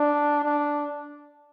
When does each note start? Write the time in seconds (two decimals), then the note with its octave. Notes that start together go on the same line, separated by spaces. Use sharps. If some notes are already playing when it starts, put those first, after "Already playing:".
Already playing: D4
0.43 D4